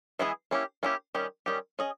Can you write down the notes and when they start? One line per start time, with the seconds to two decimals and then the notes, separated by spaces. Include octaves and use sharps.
0.19 E3 G#3 B3 E4 G#4
0.51 A#3 C#4 E4 G4
0.83 A#3 C#4 E4 G4
1.15 D#3 G3 C#4 G4
1.46 D#3 G3 C#4 G4
1.79 C#4 G#4 D#5